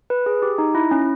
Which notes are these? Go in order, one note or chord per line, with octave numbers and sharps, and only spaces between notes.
B4
G#4
G4
D#4
E4
C#4